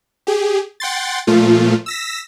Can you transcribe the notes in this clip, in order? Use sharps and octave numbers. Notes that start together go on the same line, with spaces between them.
G4 G#4
F#5 G5 C6 A6
A#2 F3 A3 F4
E6 A#6 B6